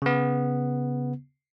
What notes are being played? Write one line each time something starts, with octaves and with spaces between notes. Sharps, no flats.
C#3 B3